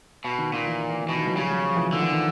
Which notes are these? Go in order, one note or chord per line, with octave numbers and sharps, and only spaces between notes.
B2
D#3
A#2 D#3
E3
D#3
E3
D#3
B2 E3
D#3 F3
E3 F#3
C#3 F3 G3
F#3
F3
E3 F#3
D3 D#3 F3
E3
D#3 F3